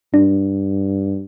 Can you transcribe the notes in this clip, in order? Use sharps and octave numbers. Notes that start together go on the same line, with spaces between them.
G2 D4